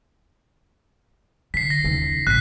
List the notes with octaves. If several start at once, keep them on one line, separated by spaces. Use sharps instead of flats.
D3 B6 C7
A#6
D#2 C#3
A1 F#6 B6